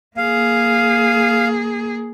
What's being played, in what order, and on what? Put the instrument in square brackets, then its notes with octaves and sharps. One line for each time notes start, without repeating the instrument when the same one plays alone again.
[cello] A#3 G#4 [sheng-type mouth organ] F5